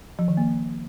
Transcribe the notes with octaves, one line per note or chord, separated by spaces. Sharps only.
F3
D#3
A#3